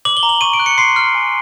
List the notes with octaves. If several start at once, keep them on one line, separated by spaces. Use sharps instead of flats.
D6 F#7
G7
A#5
F#7
C#6 D#7
D7
F#6
C#7
C6 C7
F6
G#5